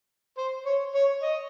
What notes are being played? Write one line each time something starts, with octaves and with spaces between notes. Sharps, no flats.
C5
C#5
C#5
D#5